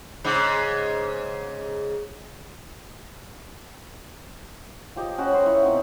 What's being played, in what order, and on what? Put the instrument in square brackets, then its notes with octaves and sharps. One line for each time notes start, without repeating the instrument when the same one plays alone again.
[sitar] G#2 C#3
[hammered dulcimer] F3 G4 D#5
C#4 F#4 B5
C5 F#5 G5 B5
E4 A#4 C#5
B2 C4 D#4 F#5